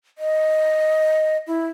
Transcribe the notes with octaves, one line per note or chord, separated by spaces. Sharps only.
D#5
E4